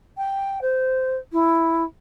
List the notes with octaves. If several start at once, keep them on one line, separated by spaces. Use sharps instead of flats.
G5
C5
E4